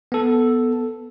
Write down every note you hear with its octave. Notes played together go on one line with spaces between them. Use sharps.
B3 A4